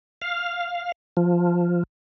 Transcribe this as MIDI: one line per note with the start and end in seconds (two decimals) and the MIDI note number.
0.22 0.92 77
1.17 1.83 53